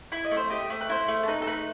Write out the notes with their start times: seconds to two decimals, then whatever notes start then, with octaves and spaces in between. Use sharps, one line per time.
0.12 E4 E5
0.25 D#5
0.31 A3
0.37 C5
0.50 G4 D#5
0.70 A3 C5
0.81 B4
0.89 E4 C5
1.08 A3
1.23 A4
1.28 D#4 B4
1.42 A4
1.47 A3 B4